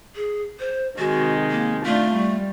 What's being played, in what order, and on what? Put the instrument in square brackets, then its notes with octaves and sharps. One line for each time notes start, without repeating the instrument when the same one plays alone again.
[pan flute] G#4
C5
[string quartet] C3 D#3 G#3 [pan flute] F#4
[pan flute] A#3
[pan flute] A3 [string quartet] D4 F4
[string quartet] G3